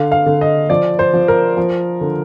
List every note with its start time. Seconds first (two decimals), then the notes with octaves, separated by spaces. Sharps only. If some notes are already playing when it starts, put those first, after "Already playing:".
Already playing: D3 F5
0.12 F5
0.26 D3
0.41 D#5
0.70 F3 D5
0.99 C5
1.13 F3
1.28 A#4
1.57 F3
2.01 D3